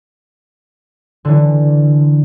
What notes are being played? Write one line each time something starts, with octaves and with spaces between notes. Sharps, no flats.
D3 E3